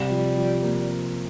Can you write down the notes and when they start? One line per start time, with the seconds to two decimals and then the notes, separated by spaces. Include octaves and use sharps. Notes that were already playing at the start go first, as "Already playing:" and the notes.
Already playing: C3 G3
0.10 F3
0.36 F3
0.63 A#3